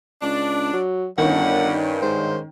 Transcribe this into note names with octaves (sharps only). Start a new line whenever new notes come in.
C#2 D4
F#3
G1 G2 D#3 C#4 F#5
G#2 C5